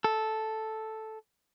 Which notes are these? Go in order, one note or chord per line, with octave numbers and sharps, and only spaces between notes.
A4